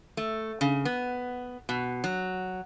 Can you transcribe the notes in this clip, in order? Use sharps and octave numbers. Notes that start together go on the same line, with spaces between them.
A3
C#3
B3
B2
F#3